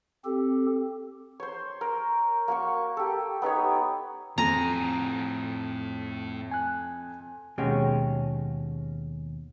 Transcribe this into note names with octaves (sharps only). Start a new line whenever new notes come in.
C4 G4 A4
C5 C#5
A#4
A#3 F#4 C#6
G4 A4
B3 D#4 G4 C#5
F2 A2 G#5 A#5
G#5 F#6
D#2 B2 G#3 C#4 F#4 G5